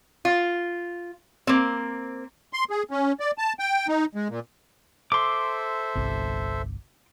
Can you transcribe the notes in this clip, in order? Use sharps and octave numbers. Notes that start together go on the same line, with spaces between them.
F4
A#3 C4
C6
G#4
C#4
D5
A5
G5
D#4
G#3
A#2
A4 C5 E5 C6 D6
G1 C2